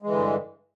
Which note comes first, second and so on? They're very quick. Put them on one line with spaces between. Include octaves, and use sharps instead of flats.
G#3 E3 D3 G2